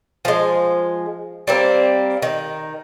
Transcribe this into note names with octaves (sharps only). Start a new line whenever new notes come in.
F3 G#3
G3 A#3 C4
D#3